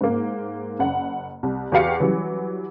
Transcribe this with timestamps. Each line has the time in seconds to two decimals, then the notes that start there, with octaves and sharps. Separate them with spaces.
0.01 G#2 A#3
0.79 F#1 F#5
1.43 C2
1.72 E2 F#4 G4 F5 C#7
2.00 E3 F#3 G3